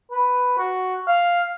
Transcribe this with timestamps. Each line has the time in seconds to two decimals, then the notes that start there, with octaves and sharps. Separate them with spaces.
0.11 B4
0.58 F#4
1.08 F5